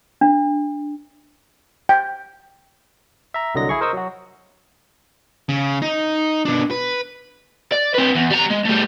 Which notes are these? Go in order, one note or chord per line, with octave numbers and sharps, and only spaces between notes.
D4
G5
E5 A#5
C2 D3 F#3 D#5 A#6
E4 G#4 C#6
A#4 C5 D#5 C#6 D#6 E6
F#3 F#4
C#3
D#4
B2 D4
B4
D5
C4 B4
E2
G3 A#5
G#3
G3 A3